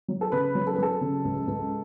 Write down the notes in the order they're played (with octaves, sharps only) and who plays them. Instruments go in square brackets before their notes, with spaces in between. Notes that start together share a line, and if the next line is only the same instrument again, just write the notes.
[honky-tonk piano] F#3
[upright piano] A4
[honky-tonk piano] C#3 [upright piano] B4
[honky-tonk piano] F#3
[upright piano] A4
B4
[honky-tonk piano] F#3 [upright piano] A4
[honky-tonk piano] C#3
C#2
C#2